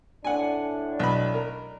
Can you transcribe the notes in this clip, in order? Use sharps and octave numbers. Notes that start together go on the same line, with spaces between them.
A2 D4 F#5 G#5
B1 B5
A#4